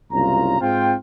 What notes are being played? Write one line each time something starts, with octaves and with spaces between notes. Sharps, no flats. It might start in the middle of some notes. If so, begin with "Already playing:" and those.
F#1 C2 C#4 F4 A#5
G#2 C4 F4 G5